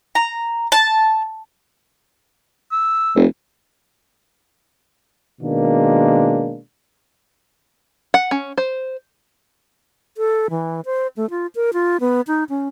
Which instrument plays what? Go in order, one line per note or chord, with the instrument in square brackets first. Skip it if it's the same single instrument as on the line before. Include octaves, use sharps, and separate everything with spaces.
[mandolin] A#5
A5
[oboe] E6
[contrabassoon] F1
[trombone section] B2 D#3 G#3 A#3 D4
[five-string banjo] F#5
C#4
C5
[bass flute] A4
E3
C5
A3
F4
A#4
F4
B3
D#4
C#4